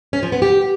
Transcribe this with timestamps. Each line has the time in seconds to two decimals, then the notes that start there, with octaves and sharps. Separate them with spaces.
0.13 C#4
0.23 F3
0.32 B3
0.42 G4